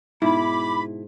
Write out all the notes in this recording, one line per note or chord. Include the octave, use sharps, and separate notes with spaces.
G#2 B2 E4 B5 D6